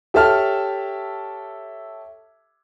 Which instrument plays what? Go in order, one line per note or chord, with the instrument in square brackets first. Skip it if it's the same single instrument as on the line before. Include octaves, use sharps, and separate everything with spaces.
[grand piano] G4 A4 C#5 E5 A5 F6